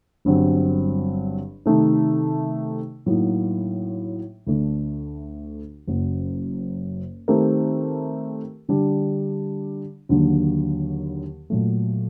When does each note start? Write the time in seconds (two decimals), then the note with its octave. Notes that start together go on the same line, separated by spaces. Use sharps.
0.25 G1 G2 F#3 C4
1.66 C3 D#3 A3 D#4
3.06 A2 F#3 A#3 D#4 F#4
4.47 D2 D3 A3 D4
5.87 F#1 F#2 F#3
7.28 D#3 A3 C4 G4 A#4
8.69 D3 G3 D4
10.09 D#2 D3 F#3 A#3
11.50 A#2 F#3 A3